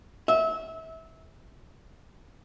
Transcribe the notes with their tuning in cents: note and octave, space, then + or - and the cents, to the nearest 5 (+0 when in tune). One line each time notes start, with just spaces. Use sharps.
E5 -25